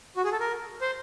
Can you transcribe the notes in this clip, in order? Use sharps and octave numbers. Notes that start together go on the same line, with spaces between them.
F#4
G#4
A4
A#4
C5